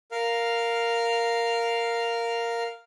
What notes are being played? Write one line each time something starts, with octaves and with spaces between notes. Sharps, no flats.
A#4 F5 F6